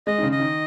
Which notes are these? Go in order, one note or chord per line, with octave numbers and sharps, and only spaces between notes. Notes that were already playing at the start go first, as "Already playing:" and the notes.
G#3 D#5
D#3
C#3
D#5
D#3